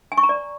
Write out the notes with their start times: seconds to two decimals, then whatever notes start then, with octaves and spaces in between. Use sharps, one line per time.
0.12 G#5
0.17 C#6
0.23 A#5
0.29 D5